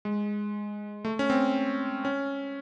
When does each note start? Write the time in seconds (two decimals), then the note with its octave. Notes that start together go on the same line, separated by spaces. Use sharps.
0.05 G#3
1.05 A3
1.19 C#4
1.30 C4
2.05 C#4